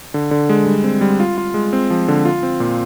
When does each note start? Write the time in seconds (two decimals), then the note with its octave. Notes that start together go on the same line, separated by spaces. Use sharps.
0.14 D3
0.31 D3
0.49 G#3
0.66 G3
0.84 C4
1.01 G3
1.20 F4
1.38 F4
1.54 G#3
1.73 C4
1.90 F3
2.08 D3
2.25 F4
2.43 C4
2.60 A#2